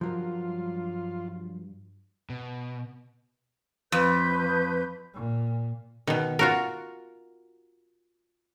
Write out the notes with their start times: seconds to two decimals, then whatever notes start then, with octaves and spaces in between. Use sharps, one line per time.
0.01 G2 F3 F#3 F4 A#4
2.30 B2
3.92 F2 B4 G6
5.14 A#2
6.07 B2 D#3
6.39 F4 F#4 A#4